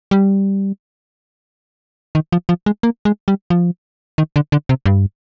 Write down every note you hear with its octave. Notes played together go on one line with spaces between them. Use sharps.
G3
D#3
F3
F3
G#3
A#3
G#3
G3
F3
D#3
D3
D3
C3
G2